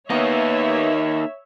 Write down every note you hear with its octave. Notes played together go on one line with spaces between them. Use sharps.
A#3 B3 D#4 C#5 E5